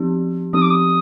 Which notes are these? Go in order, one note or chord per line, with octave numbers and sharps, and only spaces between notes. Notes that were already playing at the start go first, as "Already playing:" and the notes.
Already playing: F3 C4 D#4 G4
F3 C4 D#4 G4 D#6
D6
D#6